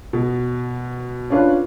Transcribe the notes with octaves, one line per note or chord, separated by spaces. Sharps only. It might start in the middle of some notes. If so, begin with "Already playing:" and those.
B2
C#4 D4 F4 B4